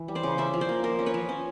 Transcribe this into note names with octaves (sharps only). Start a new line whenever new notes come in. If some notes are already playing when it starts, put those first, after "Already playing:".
Already playing: E3
G3
C5 D5
C#3
C#4 D5 E5
F3
C5 D5
A#3
F3 A#4 C5
C#4
B4 C#5
F3
C#4